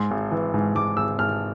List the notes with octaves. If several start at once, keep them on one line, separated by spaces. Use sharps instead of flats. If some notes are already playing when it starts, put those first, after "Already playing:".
Already playing: G#2 C6
G#1
E3
G#2
G#2 D6
G#1 E6
G#1 F6